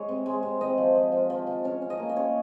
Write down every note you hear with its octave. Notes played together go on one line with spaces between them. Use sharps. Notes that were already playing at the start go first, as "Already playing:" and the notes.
Already playing: G#3 C#5 D#5
C3
G#3
C3
C4 D#5
F3
F3
F3
F3
F3
C#4 C#5
C#4
D#5
A#3
D#5
C#4 C#5